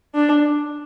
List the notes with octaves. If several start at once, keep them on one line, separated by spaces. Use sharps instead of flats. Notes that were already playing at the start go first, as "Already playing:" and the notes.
D4